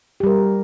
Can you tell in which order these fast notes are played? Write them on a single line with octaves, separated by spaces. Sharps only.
G4 G3 A#4